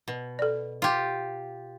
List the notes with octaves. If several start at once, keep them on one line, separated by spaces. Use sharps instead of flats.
B2
A4 D5
F4 G4